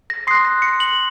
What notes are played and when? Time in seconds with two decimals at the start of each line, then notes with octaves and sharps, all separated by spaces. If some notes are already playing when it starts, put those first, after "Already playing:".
0.10 A#6
0.27 C6 D#6 F#6 C7
0.45 A#6
0.62 C#7
0.80 F#7